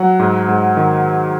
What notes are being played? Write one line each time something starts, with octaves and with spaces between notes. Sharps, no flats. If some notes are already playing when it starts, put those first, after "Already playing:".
Already playing: F#3 F#5
G#2
G#2
D#3